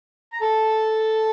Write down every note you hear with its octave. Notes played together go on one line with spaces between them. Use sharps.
A#5
A4 A5